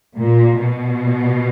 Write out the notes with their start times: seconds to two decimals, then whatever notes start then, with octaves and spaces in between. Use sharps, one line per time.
0.16 A#2
0.58 B2